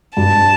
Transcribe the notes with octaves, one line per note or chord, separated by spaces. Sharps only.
G2 A5